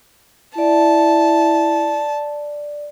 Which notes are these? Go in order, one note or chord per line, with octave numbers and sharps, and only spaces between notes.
E4 D5 A5